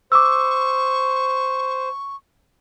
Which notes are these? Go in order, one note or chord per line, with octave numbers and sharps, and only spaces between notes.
C5 C#6 D6 E6